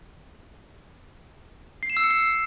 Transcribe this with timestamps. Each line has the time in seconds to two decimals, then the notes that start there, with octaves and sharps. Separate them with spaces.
1.83 C7
1.90 E7
1.97 E6
2.04 C#7
2.11 C7